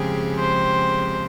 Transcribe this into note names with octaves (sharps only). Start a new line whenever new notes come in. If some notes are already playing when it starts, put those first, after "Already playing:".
Already playing: C#3 F3 G#3 C4 G4 G#4
C5